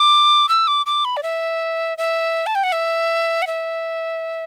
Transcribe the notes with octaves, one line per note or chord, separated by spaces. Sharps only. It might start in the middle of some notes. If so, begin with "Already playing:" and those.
Already playing: D6
E6
D6
D6
B5
D5
E5
E5
A5
G5
F#5
E5
F#5
E5